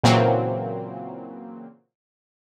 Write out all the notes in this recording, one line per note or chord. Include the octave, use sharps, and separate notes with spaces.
A#2 C#3 E3 F#3 A#3 C4